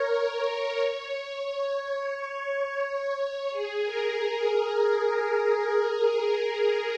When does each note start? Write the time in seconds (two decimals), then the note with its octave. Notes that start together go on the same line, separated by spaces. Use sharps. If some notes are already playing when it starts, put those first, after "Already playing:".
Already playing: A#4 C#5
0.11 A#4
0.45 C#5
0.79 C#5
1.47 C#5
2.14 C#5
2.83 C#5
3.51 G#4
3.85 A#4